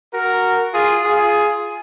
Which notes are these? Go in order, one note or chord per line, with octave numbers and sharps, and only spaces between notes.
F#4 A#4
F4 G#4
F4 G#4